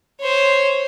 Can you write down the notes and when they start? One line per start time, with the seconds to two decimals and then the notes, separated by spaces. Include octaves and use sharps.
0.20 C5 C#5